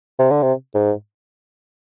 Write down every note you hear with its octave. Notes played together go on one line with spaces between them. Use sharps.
C3
D3
C3
G#2